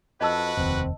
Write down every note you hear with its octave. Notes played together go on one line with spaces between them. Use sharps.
F2 F#4 B4 D#5 A5 E6
F1 D#2 C4